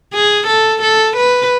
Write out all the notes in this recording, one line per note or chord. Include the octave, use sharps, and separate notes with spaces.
G#4
A4
A4
B4